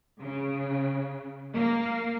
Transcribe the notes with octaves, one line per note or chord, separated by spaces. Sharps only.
C#3
A#3